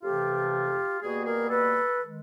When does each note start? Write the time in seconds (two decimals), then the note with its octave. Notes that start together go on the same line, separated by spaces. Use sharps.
0.02 F2 C3 E3 A3 F4 G4
1.00 B2 G3 A#3 F#4 G#4
1.25 G#4 A#4
1.50 A4 B4
2.01 D#3 G#3